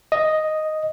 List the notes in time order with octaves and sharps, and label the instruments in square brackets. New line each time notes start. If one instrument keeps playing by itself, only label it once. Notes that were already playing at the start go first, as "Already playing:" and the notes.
[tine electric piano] D#5